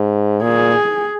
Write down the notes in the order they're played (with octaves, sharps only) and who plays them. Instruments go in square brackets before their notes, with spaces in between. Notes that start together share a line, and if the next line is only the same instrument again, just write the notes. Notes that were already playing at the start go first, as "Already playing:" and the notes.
Already playing: [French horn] G#2
[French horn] A#2 [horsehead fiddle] G#4